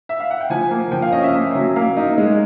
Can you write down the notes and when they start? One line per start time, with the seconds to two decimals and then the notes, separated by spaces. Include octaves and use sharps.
0.09 E5
0.20 F5
0.31 F#5
0.41 G5
0.50 F3 G#5
0.71 A#3
0.92 F3 G5
1.02 F5
1.12 C#4 D#5
1.23 E5
1.34 A#3
1.55 F#3
1.76 A#3 F5
1.97 D#4
2.18 G#3